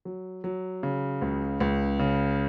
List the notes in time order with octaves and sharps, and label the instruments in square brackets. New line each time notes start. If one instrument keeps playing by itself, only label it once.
[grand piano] F#3
F#3
C#3
C#2
C#2
C#3